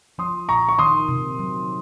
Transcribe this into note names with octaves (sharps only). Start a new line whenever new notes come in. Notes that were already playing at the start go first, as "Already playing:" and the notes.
F3 C6 D#6
A#2 A#5 C#6
C#6
D#3 C6 D#6
C3
F#3